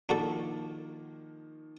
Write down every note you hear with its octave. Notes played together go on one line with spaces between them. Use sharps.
D#3 F3 A#3 D4 F#4 A4